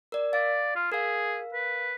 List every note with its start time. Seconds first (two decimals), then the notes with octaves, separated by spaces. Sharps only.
0.12 A#4 D5
0.33 D5 F5
0.76 F4
0.92 G#4 A#4 F5
1.54 B4